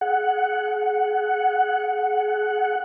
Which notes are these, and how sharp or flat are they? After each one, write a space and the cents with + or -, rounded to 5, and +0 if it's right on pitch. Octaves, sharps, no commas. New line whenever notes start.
G#4 +30 F#5 +0